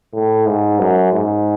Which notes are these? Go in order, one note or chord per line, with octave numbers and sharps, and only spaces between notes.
A2
G#2
F#2
G#2